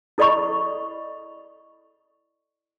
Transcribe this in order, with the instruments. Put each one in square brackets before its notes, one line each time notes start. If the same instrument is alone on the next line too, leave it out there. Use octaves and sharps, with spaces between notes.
[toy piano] E4 A4 D5 D#5 B5 C#6